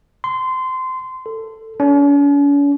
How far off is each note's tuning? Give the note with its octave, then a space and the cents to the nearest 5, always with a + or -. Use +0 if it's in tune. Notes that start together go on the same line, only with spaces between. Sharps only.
C6 -20
A4 +15
C#4 +45